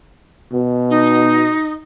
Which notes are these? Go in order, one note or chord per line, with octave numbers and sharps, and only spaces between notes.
B2
D#4